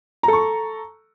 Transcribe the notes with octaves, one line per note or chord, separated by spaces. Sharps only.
A4 A#5 C#6